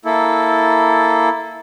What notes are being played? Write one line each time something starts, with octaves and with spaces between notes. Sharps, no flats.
A#3 E4 A4